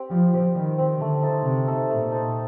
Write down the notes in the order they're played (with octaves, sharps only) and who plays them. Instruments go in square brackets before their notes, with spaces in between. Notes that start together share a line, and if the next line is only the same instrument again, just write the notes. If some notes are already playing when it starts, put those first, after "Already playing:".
Already playing: [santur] C4 G4
[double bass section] F3 [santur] G3
[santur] C4 G4
[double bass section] D#3 [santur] G3
[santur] C4 G4
[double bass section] D3 [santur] A3
[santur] D#4 A4 C5
[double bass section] C3 [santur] A3
[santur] D#4 A4 C5
[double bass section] A#2 [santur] A3
[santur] D#4 A4 C5